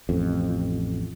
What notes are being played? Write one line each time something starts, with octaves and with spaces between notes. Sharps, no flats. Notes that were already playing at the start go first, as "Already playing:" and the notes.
A1 F2